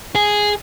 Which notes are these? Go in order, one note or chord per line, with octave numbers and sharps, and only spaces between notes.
G#4